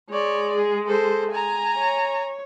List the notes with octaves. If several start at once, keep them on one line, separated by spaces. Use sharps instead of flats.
G#3 C#5 D5
G#4
A4 C5
G#5 A#5
C#5